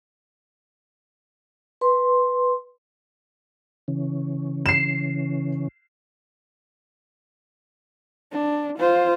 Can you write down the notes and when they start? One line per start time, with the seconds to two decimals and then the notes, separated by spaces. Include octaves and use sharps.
1.81 B4 C6
3.88 C#3 E3 C#4
4.66 C7 E7
8.32 D4
8.78 F4 C5